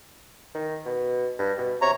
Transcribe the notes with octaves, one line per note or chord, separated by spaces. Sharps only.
D#3
B2
G2
B2
C3 C#5 A#5